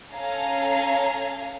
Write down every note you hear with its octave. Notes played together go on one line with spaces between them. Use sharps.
C#4 A4 F5 G#5 A#5